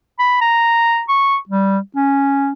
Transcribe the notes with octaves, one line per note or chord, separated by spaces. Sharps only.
B5
A#5
C#6
G3
C#4